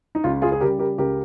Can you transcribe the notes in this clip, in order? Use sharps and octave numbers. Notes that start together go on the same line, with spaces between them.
D#4
C#2 F4
F4 G#4
G#4
C#3 G3 G4 A#4
G4 A#4
C#2 G4 A#4